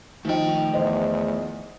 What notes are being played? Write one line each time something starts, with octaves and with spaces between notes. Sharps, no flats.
D#3 F3 A3 D#4 G5
E2 C5 D#5